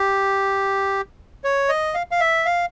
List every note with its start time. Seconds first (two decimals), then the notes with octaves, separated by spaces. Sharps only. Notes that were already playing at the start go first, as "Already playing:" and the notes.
Already playing: G4
1.44 C#5
1.69 D#5
1.94 F5
2.11 F5
2.20 E5
2.46 F5